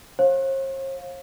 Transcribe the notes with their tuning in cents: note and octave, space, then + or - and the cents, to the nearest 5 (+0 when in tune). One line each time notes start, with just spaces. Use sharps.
C5 +45 F5 +15